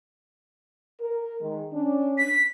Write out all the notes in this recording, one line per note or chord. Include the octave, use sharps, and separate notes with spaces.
A#4
D#3 G#3
C#4 D4
B6